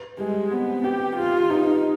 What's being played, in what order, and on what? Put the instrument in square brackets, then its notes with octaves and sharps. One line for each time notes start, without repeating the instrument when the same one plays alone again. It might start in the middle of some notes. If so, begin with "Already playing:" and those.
Already playing: [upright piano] B4
[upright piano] G3 [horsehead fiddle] G#3
[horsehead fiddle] B3 [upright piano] C4
[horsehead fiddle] G4 [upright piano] B4
[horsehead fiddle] F4 [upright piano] G4
[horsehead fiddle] D#4 [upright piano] B4